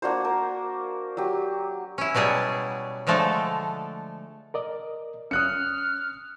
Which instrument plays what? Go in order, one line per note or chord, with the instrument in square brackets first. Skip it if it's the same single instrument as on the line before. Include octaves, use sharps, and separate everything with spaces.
[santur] A#3 D4 F#4 C5
A#4
F#3 G4
[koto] C#4 E4
B2 F#3 G3 G#4 F#5
D3 F3 G#3 A3 A4
[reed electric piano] A#4 D5 D#5
[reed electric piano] C#4 [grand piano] D#6 F#6 C#7 [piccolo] F6